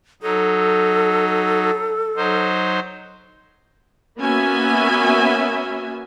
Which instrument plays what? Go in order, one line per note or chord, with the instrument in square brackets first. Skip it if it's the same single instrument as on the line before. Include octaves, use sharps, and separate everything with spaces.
[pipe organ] F#3 D#4 [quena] A4
[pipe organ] F#3 D#4 C5
[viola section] A#3 B3 C#4 F#4 E5 G#5